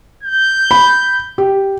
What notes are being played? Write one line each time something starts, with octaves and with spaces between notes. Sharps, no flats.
G6
B5
G4